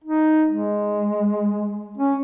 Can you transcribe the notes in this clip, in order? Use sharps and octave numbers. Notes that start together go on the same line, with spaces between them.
D#4
G#3
C#4